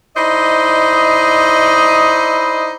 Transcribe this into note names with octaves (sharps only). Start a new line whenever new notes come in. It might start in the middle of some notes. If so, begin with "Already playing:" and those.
D#4 E4 C5 D5 D#5